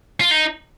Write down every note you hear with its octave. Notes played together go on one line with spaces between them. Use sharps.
F4
D#4